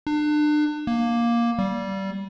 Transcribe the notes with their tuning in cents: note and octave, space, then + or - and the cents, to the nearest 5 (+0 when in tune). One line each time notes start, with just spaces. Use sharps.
D4 +35
A#3 +10
G3 -20